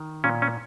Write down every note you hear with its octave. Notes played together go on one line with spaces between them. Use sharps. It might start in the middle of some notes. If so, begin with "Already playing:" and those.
Already playing: D#3
A#2 C#4
C#4